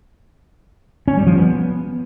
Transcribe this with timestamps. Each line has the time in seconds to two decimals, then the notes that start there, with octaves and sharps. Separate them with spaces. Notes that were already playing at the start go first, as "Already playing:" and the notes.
1.08 C#4
1.17 G3
1.27 F3
1.36 B3